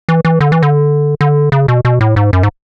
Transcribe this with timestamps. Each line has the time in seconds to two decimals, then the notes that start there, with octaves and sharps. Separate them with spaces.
0.09 E3
0.25 E3
0.41 D3
0.52 E3
0.63 D3
1.21 D3
1.52 C#3
1.68 B2
1.85 B2
2.01 A2
2.16 G#2
2.33 F#2
2.43 G#2